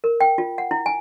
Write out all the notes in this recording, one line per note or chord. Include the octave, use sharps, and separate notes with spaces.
A#4
G5
F4
F#5
E4
G#5